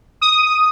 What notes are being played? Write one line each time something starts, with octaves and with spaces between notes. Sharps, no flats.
D#6